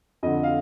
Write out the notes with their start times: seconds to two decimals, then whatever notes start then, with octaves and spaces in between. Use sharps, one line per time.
0.23 F2 D3 D#5
0.43 F5